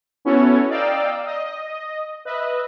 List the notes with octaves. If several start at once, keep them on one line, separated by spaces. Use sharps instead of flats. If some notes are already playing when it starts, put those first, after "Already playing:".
B3 C#4 E4 F#4 A4 C#5
D5 D#5 F5 G5 A#5 E6
D#5
B4 D#5 E5